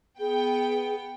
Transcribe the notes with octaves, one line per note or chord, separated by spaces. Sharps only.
B3 G#4 G5